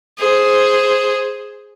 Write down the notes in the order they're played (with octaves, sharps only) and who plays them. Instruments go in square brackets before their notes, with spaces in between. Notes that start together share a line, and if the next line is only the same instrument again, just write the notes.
[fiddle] G#4 C5